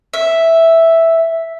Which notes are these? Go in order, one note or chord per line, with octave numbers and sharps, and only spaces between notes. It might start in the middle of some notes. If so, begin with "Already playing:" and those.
E5